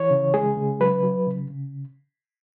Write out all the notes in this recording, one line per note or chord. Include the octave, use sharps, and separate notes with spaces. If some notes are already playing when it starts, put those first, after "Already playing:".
Already playing: E3 C#5
C#3
G#3 G#4
C#3
F#3 B4
F#3
C#3
C#3